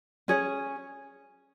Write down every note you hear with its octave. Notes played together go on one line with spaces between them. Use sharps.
C#4 G#4 C#5